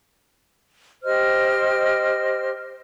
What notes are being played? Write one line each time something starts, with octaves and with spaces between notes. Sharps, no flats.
G4 C5 D#5 F6